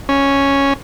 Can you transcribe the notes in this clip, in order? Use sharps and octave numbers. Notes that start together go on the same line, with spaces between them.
C#4